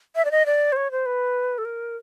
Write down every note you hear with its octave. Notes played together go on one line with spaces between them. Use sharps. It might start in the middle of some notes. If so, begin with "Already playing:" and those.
E5
D5
D#5
D5
C5
C#5
C5
B4
A4
A#4